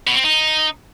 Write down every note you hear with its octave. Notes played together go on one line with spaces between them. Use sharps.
B2
C4
D#4